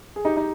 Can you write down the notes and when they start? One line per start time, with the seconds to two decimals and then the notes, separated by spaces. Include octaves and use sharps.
0.16 G#4
0.25 D#4 G4
0.37 D#4